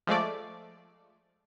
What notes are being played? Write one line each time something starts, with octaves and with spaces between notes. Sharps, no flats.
F3 G#3 A3 D5